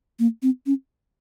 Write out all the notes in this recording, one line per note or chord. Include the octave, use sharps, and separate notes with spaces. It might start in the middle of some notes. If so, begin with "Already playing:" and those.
A#3
C4
C#4